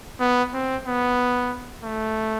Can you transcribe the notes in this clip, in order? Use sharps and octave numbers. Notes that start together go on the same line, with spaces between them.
B3
C4
B3
A3